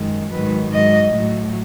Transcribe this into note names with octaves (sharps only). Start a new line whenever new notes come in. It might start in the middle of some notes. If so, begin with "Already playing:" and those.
Already playing: F#2 D#3 G#3
G#2 D#3 F#3 B4
G#2 F#3 D#5
A2 F#3